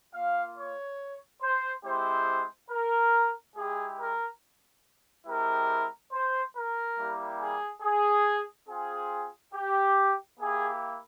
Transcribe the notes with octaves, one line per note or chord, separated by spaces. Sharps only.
A#3 F4 F5
C#5
C5
G#3 C4 E4 G4 C5
A#4
G#3 E4 G4 G#4
A#4
G#3 C4 E4 G4 A#4
C5
A#4
G3 A#3 E4 G4
G#4
G#4
C4 F4 G#4
G4
A#3 E4 G4 G#4